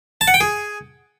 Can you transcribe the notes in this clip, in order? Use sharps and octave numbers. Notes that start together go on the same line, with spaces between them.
A5
F#5
G5
G#4